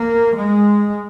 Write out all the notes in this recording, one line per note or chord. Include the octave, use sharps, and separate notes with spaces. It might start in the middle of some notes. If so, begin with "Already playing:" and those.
Already playing: A#3
G#3